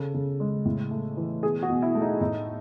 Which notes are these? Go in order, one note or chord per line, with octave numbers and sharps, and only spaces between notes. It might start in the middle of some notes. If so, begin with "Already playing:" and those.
Already playing: C#3 A4
C#3
G#3
A2
A3
E3
B2 G#4
F#4
B2
E4
A3
D#4
A2 D#4